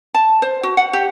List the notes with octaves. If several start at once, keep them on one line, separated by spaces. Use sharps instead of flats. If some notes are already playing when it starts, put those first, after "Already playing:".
A5
C5
F#4
F#5
G4